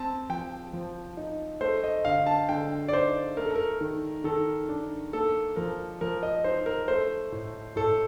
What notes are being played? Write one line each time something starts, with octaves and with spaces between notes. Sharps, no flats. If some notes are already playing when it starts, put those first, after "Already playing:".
Already playing: C4 A5
F3 G5
F3
D#4
A3 C5
D#5
D3 F5
A5
D3 G5
D5
D#4 C5
A3 A#4
A4
A#4
D#3
D#3 A4
D4
A#3 A4
F3 A#4
F3 A#4
D#5
D#4 C5
A#4
A3 C5
A2
A2 A4